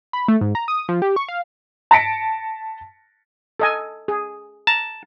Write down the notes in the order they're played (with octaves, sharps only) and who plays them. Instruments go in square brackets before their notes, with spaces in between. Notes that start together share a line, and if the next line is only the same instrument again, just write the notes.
[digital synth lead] B5
A3
G#2
A#5
D#6
F3
G4
C#6
F5
[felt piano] A5 A#6 B6 C#7 D7
[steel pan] A4 D#5 G#5
G#4
[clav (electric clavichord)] A5 [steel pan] A#5